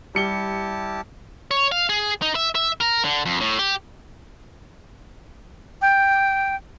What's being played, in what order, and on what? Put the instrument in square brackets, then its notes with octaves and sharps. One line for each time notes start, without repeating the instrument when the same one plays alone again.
[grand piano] G3 C#7 G7 [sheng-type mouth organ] E4 G4 A5
[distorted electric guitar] C#5
F5
G#4
D#4
E5
E5
A#4
D3
F2
A2
G4
[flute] G5